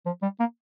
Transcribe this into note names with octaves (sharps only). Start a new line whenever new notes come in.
F3
G3
A#3